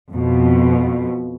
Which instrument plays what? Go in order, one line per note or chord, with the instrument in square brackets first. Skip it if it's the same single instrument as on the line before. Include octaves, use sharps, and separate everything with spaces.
[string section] F2 B2